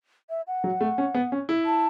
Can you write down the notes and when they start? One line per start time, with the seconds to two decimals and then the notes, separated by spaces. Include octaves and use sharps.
0.30 E5
0.47 F#5
0.64 F#3
0.81 A3
0.98 C#4
1.15 B3
1.32 C#4
1.49 E4
1.65 A5